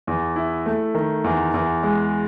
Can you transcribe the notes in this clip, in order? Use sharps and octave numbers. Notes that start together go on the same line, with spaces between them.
E2
E4
A3
D#3
E2
E2
G#3